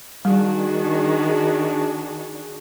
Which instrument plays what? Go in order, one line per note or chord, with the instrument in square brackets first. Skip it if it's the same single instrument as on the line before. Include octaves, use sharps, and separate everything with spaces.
[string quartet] D#3 [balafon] G3 [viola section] D4 F#4 G#4